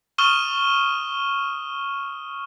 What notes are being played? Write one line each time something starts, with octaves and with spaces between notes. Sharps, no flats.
C#6 D#6 F6 D#7 E7 G7